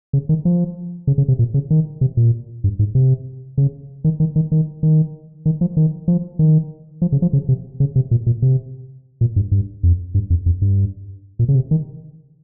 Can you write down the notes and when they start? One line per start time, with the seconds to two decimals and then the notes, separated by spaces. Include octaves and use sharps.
0.13 C#3
0.29 D#3
0.45 F3
1.07 C#3
1.18 C#3
1.28 C3
1.39 A#2
1.54 C#3
1.70 D#3
2.01 C3
2.17 A#2
2.64 G2
2.79 G#2
2.95 C3
3.58 C#3
4.04 D#3
4.20 D#3
4.36 D#3
4.52 D#3
4.83 D#3
5.46 D#3
5.61 F3
5.77 D#3
6.08 F3
6.39 D#3
7.02 F3
7.12 C#3
7.22 F3
7.33 C#3
7.49 C3
7.80 C#3
7.96 C3
8.11 A#2
8.26 A#2
8.42 C3
9.21 A#2
9.36 G2
9.51 G2
9.83 F2
10.14 G2
10.30 F2
10.46 F2
10.62 G2
11.39 A#2
11.48 C#3
11.55 C3
11.71 D#3